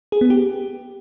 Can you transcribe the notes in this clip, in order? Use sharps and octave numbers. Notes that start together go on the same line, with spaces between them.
G#4
B3
G4